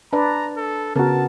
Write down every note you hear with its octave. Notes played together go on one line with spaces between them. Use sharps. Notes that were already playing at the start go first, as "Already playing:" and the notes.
D4 B4 D5 A#5
A4
C#3 B3 F#4 A#4 A5